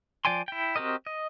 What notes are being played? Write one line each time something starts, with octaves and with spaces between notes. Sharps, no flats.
F3 D5 G5 G#5 C6
E4 G5
C4 F#4 G4 A#4 D#5
D#5